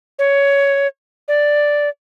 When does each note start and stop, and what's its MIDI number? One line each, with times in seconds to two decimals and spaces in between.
0.19 0.87 73
1.28 1.89 74